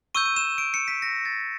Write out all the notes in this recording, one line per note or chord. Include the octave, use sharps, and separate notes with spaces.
C#6 E6 G6 D#7
D#7
E7
D7
C#7
B6
A#6
A6